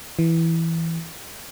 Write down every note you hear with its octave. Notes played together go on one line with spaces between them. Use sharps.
E3